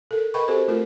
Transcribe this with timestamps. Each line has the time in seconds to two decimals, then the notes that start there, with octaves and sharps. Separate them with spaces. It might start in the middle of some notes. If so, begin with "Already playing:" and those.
0.11 A4 A#4
0.34 A#4 B4 D#5 G5 B5 C#6
0.48 C4 F#4 G4 A4 C5
0.68 A3 C4 F4 A#4